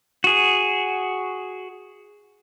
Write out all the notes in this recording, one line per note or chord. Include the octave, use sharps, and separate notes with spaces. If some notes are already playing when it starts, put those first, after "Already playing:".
F#4 G#4